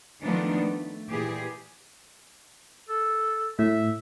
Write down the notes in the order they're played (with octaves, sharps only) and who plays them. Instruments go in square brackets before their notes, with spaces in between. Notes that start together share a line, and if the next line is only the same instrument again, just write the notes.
[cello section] D#3 F3 A3 B3 D4 D#4
A3
A#2 E3 G4 G#4
[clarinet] A4
[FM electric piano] A2 [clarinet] E5